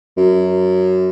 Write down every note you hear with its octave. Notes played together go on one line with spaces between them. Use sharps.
F#2